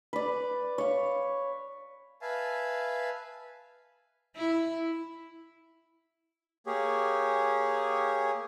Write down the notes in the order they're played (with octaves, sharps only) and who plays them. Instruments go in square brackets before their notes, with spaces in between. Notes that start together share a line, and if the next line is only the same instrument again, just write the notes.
[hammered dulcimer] B4 D5
C#5 F5
[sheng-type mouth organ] B4 E5 F5 G#5 A5
[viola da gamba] E4
[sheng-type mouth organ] A#3 G4 G#4 C#5